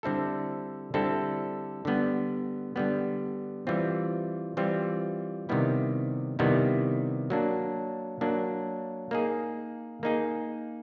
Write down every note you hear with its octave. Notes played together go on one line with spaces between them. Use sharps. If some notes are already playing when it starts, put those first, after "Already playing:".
D3 G3 C4 E4 A4
D3 G3 C4 E4 A4
D3 G3 B3
D3 G3 B3
E3 G3 C4 F4
E3 G3 C4 F4
C3 D#3 G3 B3 E4
C3 D#3 G3 B3 E4
F#3 A#3 D4
F#3 A#3 D4
A#3 D#4 G#4
A#3 D#4 G#4